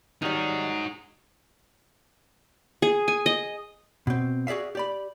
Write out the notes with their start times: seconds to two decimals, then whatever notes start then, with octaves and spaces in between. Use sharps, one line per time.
0.22 D#3 F#3 G3 D#4 G#4
2.82 G#4
3.08 G#5
3.26 D#5
4.07 B2 C4
4.47 F#4 G#4 D5 E5 F5
4.75 G4 D5 B5